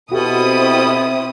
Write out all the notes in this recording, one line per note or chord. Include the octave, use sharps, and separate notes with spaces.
B2 C4 E4 F#4 G4 A4 D#6